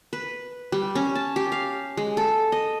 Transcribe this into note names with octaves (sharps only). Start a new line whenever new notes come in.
B4
G3
C#4
A5
G4
F5
G#3
A4
D#5